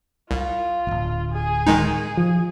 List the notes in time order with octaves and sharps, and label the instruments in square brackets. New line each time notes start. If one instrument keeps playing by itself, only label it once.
[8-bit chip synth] C2 [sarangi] F4
[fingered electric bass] D1 G#1
[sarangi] G#4
[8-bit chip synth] D#3 G#3 D#4
[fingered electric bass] F3